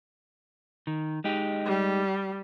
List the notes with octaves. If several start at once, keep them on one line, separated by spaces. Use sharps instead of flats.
D#3
G#3 D#4 G4
G3